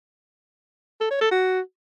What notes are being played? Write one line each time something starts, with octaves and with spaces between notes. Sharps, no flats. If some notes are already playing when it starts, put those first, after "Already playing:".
A4
C#5
A4
F#4